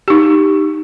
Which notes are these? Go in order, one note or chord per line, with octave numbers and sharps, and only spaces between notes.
D#4 G4